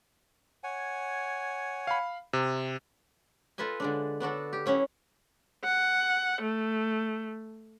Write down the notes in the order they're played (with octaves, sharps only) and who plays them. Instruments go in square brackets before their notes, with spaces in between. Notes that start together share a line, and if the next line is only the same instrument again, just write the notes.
[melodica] C#5 F#5 G#5
[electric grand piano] F5 B5
C3
[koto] F4 A4 B4 D#5 G#5
D3 G#3 D4
B3 D4 F#4 A4
G4
F#3 C#4 E4 F#5
[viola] F#5
A3